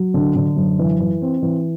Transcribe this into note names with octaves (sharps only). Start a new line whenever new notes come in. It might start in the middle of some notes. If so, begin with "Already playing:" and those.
Already playing: F#3
D3
D3
F#2
E3
E3
C4
E3